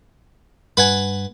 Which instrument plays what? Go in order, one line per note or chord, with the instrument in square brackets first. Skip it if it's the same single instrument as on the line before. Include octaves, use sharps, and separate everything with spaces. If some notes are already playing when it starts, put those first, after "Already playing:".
[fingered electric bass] G2 [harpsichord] B4 F#5 G#5